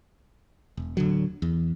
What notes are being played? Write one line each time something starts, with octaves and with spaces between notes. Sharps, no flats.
E1
D1 D3 F#3
E2